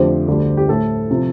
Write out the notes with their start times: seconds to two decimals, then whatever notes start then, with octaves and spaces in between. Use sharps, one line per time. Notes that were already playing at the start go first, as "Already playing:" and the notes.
Already playing: F2 D3 F3 A3 G4 C5
0.28 D2 D3 G3
0.57 G4
0.68 A2 A3 A4
1.10 C3 F3